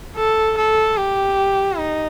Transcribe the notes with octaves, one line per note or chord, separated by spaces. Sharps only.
A4
A4
G4
D#4